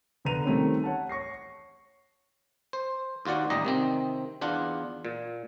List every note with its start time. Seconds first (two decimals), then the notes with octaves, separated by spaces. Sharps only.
0.25 B2 D3 B4 A#5 D#7 F7
0.46 D#3 G3 A3 C4 C#4
0.84 C#5 F#5 A5
1.09 C#5 C#6 A#6 C7
2.73 C5
3.25 D#2 F4 F#4 D5 F#5
3.50 A1 D#2 G3 D5 D#5 A#5
3.65 C3 D#3 C4
4.41 E2 D4 F4 F#5
5.05 A#2